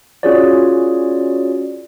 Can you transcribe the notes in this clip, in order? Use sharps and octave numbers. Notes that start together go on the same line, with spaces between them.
C#4 F4 F#4 G#4 C#5 D5